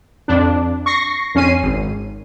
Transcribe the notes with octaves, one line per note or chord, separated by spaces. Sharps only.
F2 D4
C#6 A#6 C7
F2 C#4 C7 D#7
G#1